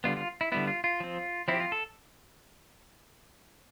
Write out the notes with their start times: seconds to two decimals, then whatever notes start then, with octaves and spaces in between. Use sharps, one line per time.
0.04 D3 G3 B3 F4
0.17 F4
0.41 E4
0.52 D3 G3 B3 E4
0.67 F4
0.84 F4
1.00 F3 C4
1.48 F3 C4 E4
1.54 G4
1.60 F4
1.72 A4